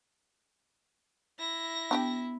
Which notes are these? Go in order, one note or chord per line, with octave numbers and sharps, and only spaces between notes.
E4 A#6
B3 D4 G4 G5